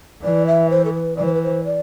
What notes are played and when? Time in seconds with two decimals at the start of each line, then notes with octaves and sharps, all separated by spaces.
0.23 E3 D5
0.47 E5
0.70 C5
0.85 A4
0.93 B4
1.17 E3 D5
1.25 C5
1.34 B4
1.43 C5
1.64 D5